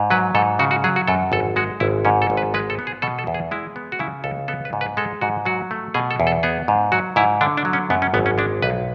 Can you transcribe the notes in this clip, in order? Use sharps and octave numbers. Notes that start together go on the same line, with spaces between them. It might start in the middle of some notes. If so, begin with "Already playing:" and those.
Already playing: G#2
F#3 B4
G#2 A4
C#3 F#4
F#4
F#3 G#4
F#4
F#2 A4
G#1 A4
G#3 F#4
G#1 E4
G#2 C#4
A4
G#1
B4
G#3 B4
A4
B3
G#4
B2 A4
A4
E2
G#4
G#3 E4
B3
F#4
C#3 E4
C#2 A4
B3 A4
B4
G#2
B4
G#3 A4
G#2 F#4
F#3 F#4
A3
B2 G#4
A4
E2
A4
B3 G#4
G#2
F#3 F#4
G#2 E4
D3 D4
D4
F#3
C#4
F#2 B3
C#4
G#1 B3
C#4
G#3 D4
B1 B4